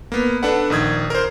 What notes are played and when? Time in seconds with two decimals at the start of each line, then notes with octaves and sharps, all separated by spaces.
0.12 A#3 B3
0.43 D4 A4 B4 F#5
0.70 A#1 D#3 D#6 G#6
1.10 A#4 C5